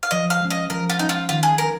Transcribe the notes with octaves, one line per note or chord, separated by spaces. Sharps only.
F5
F3 D#5
F5
G#3 C#4
D#5
F3 A#4
F4
G#3 C#4 D#4
F4
D#3 F4
G#4
C#4 G#4 A#4